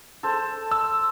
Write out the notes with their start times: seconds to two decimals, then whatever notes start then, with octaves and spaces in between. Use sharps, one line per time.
0.23 A4 C5
0.72 E6